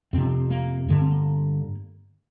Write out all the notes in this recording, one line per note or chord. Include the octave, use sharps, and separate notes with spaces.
F2 C3 C4 D4
C4
A#3
G2 D3 A#3
C4
A#3